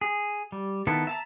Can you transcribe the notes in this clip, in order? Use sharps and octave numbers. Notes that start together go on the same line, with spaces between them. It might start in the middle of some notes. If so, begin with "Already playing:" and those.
G#4
G3
D#3 B3 E4 A4
E5 A5 A#5